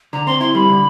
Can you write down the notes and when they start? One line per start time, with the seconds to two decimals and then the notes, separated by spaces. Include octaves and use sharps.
0.13 D3 A#5
0.26 C4 C6
0.40 E4 C6
0.55 G3 B5
0.69 D3